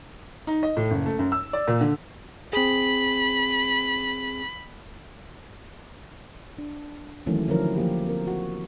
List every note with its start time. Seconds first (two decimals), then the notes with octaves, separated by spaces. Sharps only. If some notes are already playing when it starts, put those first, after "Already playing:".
0.47 D#4
0.63 D#5
0.77 A2
0.90 F#1
1.06 A3
1.19 F#2
1.32 E6
1.53 D5
1.68 A#2
1.81 D3
2.53 C4 G#4 B5
6.58 D4
7.26 D#3 E3 F#3 A3 A#3 C#4
7.48 D3 F3 F#3 C#4 E4 A#4
7.76 F3 A#3 G4
8.07 C4 A#4
8.27 F#4